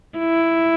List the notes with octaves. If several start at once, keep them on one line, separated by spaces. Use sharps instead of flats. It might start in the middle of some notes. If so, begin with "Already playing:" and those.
E4